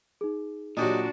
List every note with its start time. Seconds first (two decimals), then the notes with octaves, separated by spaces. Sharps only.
0.21 D#4 G#4
0.77 A#2 F#3 D4 F#4 G4 D#5